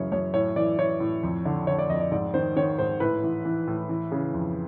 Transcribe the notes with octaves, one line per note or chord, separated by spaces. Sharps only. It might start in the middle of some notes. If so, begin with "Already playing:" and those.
Already playing: F#2 C#3 E3 C#5
F#2 C#5
A2 C#5
E3 D5
E3 C#5
A2
F2
D3
D3 C#5
D5
F2 D#5
D5
G#2 D5
D#3 C5
D#3 C#5
G#2 C5
A2 B4
E3
E3
A2
E3
C#3
F2